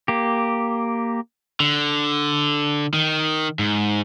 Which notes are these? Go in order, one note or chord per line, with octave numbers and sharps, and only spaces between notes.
A#3 G4
D3
D#3
G#2